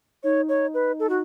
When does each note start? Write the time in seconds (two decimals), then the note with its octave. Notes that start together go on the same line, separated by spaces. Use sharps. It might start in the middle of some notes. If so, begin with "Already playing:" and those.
0.24 D#4 C#5
0.49 C#5
0.74 B4
0.99 A4
1.09 F#4